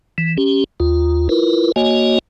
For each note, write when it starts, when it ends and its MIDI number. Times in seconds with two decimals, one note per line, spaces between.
0.18 0.37 52
0.38 0.64 61
0.38 0.64 67
0.80 1.28 39
0.80 1.28 65
1.29 1.72 64
1.29 1.72 65
1.29 1.72 70
1.29 1.72 71
1.76 2.19 58
1.76 2.19 66
1.76 2.19 73
1.76 2.19 75
1.76 2.19 80